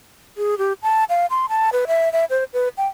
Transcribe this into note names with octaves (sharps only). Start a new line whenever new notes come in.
G#4
G4
A5
F5
C6
A5
B4
E5
E5
C5
B4
G5